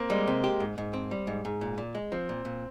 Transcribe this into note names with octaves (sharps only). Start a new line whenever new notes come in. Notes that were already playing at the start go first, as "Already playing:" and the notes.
Already playing: A#3 C4
G3 G#3
C3
G4
G#2
G#2
C4
G3
G#2
G#2
A#2
A#2
G#3
F3 C4
A#2
A#2